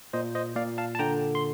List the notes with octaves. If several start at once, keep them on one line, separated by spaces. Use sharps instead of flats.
A#2 C5 D#5
C5 D#5
A#2 D5 F5
F5 A5
A5
D3 G5 A#5
C6